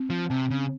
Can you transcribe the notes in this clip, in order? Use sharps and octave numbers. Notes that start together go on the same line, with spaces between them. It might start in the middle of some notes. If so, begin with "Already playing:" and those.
Already playing: C4
F3
C3 C4
C#3